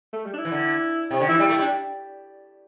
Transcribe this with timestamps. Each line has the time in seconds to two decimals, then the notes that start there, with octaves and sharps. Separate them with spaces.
0.13 A3
0.25 G3
0.34 D4
0.38 E4
0.45 E3
0.52 D3
1.11 C3
1.20 D3
1.29 E3 E4
1.39 G3
1.49 A3
1.58 G3
1.62 D4